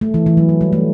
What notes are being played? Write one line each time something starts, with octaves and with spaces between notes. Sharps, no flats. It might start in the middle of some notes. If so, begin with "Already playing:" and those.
A3
E3
E3
F#3
F#3
G3
A3